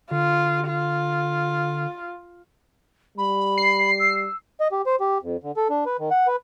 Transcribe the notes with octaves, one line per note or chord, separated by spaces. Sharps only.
D3 F4
F4
G3 B5
C7
E6
D#5
G4
C5
G4
F2
D3
A4
D4
B4
D#3
F#5
B4